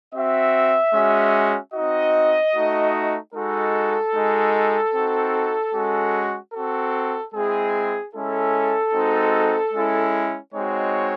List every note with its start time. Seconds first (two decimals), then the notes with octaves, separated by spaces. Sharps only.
0.14 C4 F#4 E5
0.94 G#3 C#4 F#4
1.74 C4 D#4 F#4 D#5
2.54 A3 D#4 F#4
3.34 G#3 D#4 F#4 A4
4.14 G#3 D#4 F#4
4.94 C4 D#4 F#4
5.74 G#3 C#4 F#4
6.53 C4 F#4 A4
7.34 G#3 C4 E4 G#4
8.13 G#3 C#4 E4 A4
8.93 G#3 C4 D#4 F#4
9.73 G#3 C#4 E4
10.53 G#3 C4 D#4 F#4 C#5